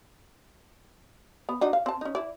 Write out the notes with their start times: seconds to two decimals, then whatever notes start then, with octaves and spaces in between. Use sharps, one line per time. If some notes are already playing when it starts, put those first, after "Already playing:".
1.49 B3
1.61 D4 D#4 F#4
1.73 F5
1.86 C4 A5
2.01 C#4 D#4
2.15 E4 D5